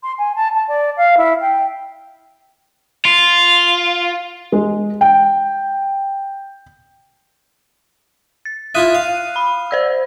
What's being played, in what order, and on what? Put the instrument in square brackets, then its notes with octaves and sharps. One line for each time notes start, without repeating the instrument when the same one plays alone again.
[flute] C6
G#5
A5
A5
D5
F5
E4
G5
[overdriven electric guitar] F4
[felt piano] G#3
G5
[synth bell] A6
[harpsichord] E4 F4 E5 [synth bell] D#6 F#6 D#7
[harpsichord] F5
[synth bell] B5
C5 D5 E6